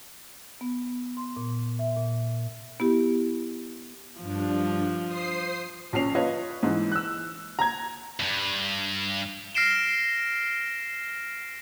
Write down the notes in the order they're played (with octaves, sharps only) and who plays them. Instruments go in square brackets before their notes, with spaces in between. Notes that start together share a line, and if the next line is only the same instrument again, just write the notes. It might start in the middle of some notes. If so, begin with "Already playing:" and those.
[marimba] B3
C6
A#2
E5
A#2
B3 E4 G4
[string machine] G2 D4 [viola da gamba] F3
[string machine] C5 D#6 C7
[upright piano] A#1 F3 C#4 C7 F7
F4 B4 C#5 D#5
G#2 E3
E6 F#6
A#5 G#6
[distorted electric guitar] E2 G2
[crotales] F6 A#6 C7 D7 E7 G7